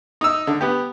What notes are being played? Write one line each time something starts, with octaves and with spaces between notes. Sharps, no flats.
D#4 E6
D3
B3 G4